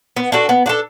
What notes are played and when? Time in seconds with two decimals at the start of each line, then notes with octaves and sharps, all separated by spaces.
0.17 B3
0.32 D4 F#4 A4
0.49 B3
0.66 D4 F#4 A4